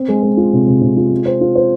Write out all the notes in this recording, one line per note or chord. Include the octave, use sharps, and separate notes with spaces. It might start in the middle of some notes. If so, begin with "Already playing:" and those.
Already playing: C4
G#3
G#3
F4
C3
C3
C3
F4
G#3
C5
F4
C5